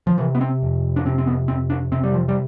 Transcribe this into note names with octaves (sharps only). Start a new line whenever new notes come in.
F3
C3 E3
B3
C4
F2
D4
C3 C4
C4
B3
F2 C4
D4
C3 C4
G3
F3
G3